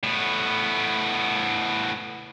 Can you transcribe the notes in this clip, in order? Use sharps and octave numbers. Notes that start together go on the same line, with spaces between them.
A2 B3